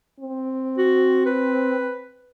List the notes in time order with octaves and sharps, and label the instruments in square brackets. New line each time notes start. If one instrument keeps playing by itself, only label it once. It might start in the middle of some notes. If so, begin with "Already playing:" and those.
[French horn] C4
[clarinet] F#4
B4